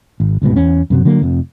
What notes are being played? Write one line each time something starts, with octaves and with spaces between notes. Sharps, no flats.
G#1
G1 C#2 G#2 B2
E2 C#4
F#2 C3 F#3
D3 F#3 A#3
F1 F2